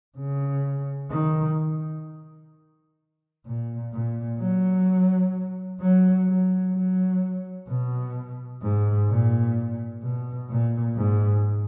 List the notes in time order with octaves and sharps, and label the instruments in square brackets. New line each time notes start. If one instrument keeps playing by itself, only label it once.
[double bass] C#3
D#3
A#2
A#2
F#3
F#3
F#3
F#3
B2
G#2
A#2
B2
A#2
G#2